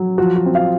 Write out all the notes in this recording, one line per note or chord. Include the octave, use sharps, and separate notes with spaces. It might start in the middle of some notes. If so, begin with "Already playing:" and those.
Already playing: F#3
F3 F#4
F#4
C4
F5